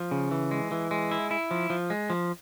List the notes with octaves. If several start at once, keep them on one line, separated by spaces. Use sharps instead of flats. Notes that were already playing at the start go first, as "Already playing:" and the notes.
Already playing: F3
C#3
E3
G#3
E3
G#3
E4
E4
F3
F3
G#3
F3